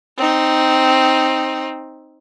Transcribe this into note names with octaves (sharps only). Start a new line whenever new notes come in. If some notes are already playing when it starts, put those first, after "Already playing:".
C4 D#4